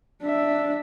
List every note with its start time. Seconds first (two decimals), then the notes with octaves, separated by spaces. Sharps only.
0.23 D4 E5